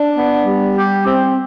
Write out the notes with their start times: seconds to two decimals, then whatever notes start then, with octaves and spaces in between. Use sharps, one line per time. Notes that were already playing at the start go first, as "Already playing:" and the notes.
Already playing: D4
0.17 B3
0.46 G3
0.76 G4
1.06 C4